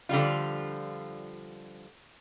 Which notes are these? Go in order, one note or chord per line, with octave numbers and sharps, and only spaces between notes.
D3 F3 G3 F4